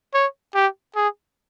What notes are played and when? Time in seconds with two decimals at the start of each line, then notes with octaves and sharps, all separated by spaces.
0.14 C#5
0.55 G4
0.96 G#4